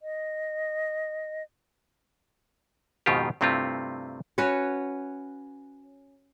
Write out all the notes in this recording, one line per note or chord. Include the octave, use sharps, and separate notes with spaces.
D#5
F2 G#2 B2 D#3 F4 G4
G2 C3 A3 C4 E4 F4
C#4 F#4 B4 C#5